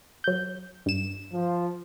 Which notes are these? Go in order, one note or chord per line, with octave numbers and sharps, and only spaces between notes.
F#3 G6
G2 E7
F3